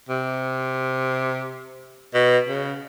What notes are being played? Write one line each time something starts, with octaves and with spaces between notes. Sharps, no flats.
C3
B2
C#3